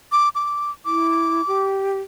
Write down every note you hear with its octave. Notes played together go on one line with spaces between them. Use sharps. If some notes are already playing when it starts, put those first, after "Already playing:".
D6
D6
E4 D6
G4